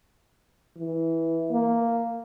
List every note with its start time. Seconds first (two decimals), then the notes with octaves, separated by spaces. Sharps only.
0.78 E3
1.51 A#3